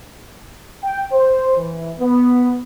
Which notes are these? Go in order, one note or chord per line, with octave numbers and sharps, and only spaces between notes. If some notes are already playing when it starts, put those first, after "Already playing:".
G5
C5
E3
B3